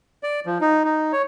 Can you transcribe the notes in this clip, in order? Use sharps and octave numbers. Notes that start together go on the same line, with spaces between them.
D5
F3
D#4
D#4
C#5